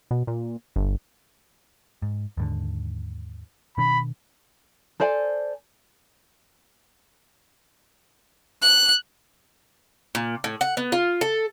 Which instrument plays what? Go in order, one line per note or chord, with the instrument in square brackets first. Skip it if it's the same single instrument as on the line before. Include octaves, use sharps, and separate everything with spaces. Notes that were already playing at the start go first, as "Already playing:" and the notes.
[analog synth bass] B2
A#2
G1
[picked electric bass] G#2
D#2 G#2 D3
[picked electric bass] B2 D#3 D4 [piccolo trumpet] B5
[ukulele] A4 C5 D5 G#5
[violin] F#6
[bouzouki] A#2
A2
F#5
B3
F4
A4